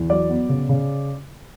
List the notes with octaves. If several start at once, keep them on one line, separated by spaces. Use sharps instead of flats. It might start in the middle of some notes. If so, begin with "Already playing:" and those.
Already playing: E2
F#3 D5
B3
C#3
C#3